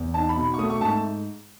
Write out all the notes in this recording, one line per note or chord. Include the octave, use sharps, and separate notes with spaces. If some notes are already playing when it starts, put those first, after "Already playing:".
Already playing: E2
D#4 A5
B5
B2
C#6
A3 D#6
C#6
G#2 A5